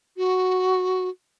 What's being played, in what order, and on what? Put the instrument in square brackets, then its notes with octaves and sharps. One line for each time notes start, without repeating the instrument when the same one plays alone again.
[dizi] F#4